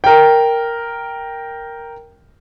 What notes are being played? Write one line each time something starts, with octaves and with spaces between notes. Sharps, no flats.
A#4 G5